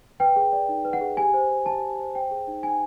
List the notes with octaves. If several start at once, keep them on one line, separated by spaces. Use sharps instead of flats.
B4 G5
G#4
D5
D#4
B4
F#5
G#4
G4 G#5
C5
C5
G4 A5
G4
C5
C5 G5
G#4
D#4
D#4 G#5